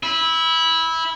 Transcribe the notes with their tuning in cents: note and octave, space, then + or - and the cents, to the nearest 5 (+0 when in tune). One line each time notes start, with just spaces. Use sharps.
E4 -15